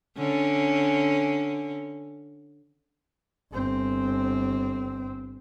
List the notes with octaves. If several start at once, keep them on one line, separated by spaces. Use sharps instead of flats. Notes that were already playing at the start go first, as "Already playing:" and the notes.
D3 C#4
G1 C4